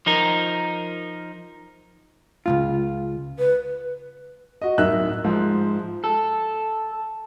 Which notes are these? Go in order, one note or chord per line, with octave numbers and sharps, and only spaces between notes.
F3 D#4 A#4
C#2 F#2 F4
B4
F#4 D#5
D1 D#4 A#4 E5 E6 F#6
G#2 F3
A4